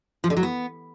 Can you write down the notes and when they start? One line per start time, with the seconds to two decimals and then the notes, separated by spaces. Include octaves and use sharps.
0.24 F3
0.30 D3
0.37 F#3
0.43 B3